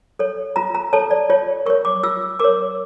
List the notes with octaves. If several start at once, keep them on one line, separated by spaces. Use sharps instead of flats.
A4 C#5
F4 A#5
A#5
A4 C#5 A5
D5
F4 C#5
A#4 C#5 C#6
D6
F4 E6
A#4 C#5 D6